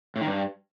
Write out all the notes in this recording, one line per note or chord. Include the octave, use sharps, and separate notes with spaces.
A2
D#3
G2